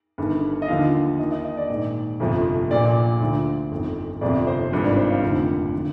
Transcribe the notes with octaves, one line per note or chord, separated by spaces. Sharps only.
G1 G2 D#3
D#5
D#2 D3 F3 F5
D#2 D#3 D#5
D#5
D#5
D5
A#1 G#2 D#3
G1 F2 C3 F3
A#1 A#2 F3 D5
D2 D3 F3
G1 F2 D#3
G1 F2 C3 F3 D5
C5
G#1 G2 F3
D5
C5
F5
F1 D#2 D3 F3
D3 F3